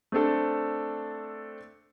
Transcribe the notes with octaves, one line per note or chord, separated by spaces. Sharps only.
A3 C4 D4 A4